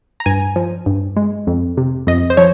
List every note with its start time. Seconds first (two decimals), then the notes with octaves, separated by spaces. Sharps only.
0.20 A#5
0.26 G2 G#5
0.56 F3
0.86 G2
1.16 G#3
1.47 F2
1.77 C3
2.07 F2 D#5
2.30 C5
2.37 F3 C#5